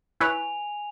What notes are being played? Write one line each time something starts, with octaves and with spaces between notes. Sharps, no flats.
E4 B4 C#5 G#5 F7